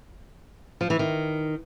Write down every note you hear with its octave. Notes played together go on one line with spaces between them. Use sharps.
F3
E3
D#3